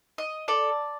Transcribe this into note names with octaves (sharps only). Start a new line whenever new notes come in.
D#5
A4 D5